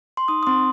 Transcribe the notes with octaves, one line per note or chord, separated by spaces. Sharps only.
C6
D#4 D#6
D#6
C4 C6